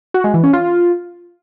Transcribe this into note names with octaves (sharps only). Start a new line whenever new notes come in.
F#4
G#3
E3
C#4
F4